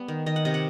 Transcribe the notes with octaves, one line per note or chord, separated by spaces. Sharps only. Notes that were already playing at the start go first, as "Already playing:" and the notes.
Already playing: G3 B3
D#3
D#3 D#5
F#5
C3 D#5
F#5